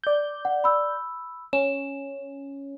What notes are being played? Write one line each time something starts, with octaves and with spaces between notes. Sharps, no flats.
D5 G6
F#5
B5 E6
C#4 E7